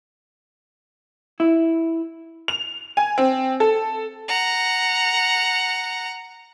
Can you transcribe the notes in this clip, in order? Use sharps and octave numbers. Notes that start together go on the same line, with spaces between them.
E4
F7
G#5
C4
A4
F#5 A#5